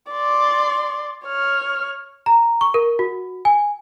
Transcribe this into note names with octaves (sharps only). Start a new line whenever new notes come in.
D5 C6
C#5 F6
A#5
C#6
A#4
F#4
G#5